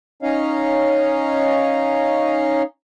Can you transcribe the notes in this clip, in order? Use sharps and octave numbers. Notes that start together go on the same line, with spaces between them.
C#4 D#4 C#5 D#5 F5